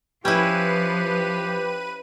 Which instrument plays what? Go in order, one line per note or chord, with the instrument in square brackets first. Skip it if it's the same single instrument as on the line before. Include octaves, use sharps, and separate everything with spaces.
[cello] F3 [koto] C#4 E4 [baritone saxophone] G4 [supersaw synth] B4 D#7